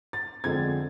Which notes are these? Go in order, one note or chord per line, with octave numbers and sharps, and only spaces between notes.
A6
F2 D3 G#3 C4 G#6